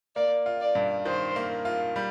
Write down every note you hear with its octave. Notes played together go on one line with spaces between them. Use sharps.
A#3 D5
F4
D5
G2
D#3 C5
A#3
F4
G3